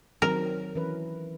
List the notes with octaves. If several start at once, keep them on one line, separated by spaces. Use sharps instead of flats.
D#3 F#3 C4 A#4
E3 C#4 B4